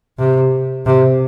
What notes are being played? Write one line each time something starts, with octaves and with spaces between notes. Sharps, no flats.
C3
C3